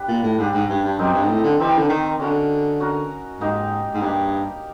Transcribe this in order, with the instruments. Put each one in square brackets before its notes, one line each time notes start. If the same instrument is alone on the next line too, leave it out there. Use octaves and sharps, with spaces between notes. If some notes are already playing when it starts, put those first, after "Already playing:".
Already playing: [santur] D4 G4 B4
[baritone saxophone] A#2
A2
[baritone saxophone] G#2 [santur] D4 G4 B4
[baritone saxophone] G#2
G2
G2
[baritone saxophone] F#2 [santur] C4 D#4 G4 A#4
[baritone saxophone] G2
G#2
A2
D3
[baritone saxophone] E3 [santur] C4 D#4 G4 A#4
[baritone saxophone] D3
D#3
[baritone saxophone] D3 [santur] C#4 F#4 A#4
[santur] C#4 F#4 A#4
[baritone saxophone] G#2 [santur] A#3 D#4 G4
[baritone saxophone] G#2
[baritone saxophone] G2 [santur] A#3 D#4 G4